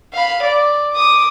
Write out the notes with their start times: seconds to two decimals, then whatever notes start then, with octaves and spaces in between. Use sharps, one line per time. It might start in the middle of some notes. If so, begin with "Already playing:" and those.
0.13 F5 B5
0.42 D5
0.93 D6 D#6